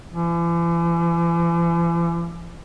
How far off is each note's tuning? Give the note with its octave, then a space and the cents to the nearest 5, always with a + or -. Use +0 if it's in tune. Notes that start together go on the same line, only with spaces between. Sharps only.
E3 +45